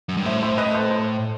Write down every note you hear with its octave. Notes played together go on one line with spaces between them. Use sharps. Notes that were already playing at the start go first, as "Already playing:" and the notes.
F#2
G2
A2 C5 E5
C5 E5
B4 D#5
A4 C5
A4 C5